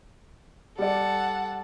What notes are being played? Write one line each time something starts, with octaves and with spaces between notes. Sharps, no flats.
G3 A4 D5 F#5